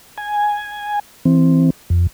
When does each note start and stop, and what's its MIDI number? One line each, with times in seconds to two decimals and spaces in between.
0.18 0.99 80
1.25 1.70 52
1.25 1.70 60
1.90 2.07 41